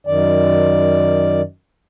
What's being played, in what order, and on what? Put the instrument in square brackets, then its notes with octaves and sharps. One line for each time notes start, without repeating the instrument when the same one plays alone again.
[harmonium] F#2 D#3 D5